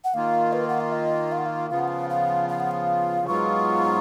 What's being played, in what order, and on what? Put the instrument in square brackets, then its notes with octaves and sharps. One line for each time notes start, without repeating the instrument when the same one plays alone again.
[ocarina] F#5
[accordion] D#3 A#3 F4 [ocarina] F5
[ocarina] B4
F#5
F5
D#5
F5
F#5
F5
[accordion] C#3 F3 B3 F4 [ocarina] F5
[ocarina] F#5
F5
F5
F5
F#5
F5
[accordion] G#2 F#3 B3 F4 [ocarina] C#6